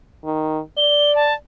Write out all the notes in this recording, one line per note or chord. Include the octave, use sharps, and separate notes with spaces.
D#3
D5 G7
A5